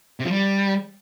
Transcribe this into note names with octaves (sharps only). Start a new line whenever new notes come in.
C3
F3
G3